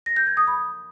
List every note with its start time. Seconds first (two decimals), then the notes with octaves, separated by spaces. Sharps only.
0.06 A#6
0.16 G6
0.27 G#6
0.37 D#6
0.47 B5